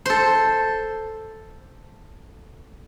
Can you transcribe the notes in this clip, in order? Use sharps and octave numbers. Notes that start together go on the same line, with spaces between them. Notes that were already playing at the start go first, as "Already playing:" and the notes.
A4 C5